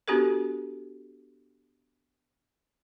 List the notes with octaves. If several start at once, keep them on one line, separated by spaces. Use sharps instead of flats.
B3 D4 F#4 G4 A4 A#4